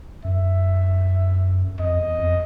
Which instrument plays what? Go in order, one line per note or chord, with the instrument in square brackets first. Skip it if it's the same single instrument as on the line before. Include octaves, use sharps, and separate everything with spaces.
[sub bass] F#2 [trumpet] E5
[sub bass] F2 [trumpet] D#5
[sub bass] E2
F2